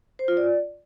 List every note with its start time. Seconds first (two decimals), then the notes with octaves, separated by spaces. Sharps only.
0.19 C5
0.28 F4
0.37 D5